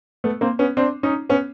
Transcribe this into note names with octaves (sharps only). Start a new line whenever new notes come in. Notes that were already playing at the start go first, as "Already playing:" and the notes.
A3 B3
A#3 C4
B3 C#4
C4 D4
C#4 D#4
B3 C#4